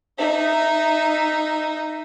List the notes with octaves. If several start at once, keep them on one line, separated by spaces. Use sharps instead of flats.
D#4 E5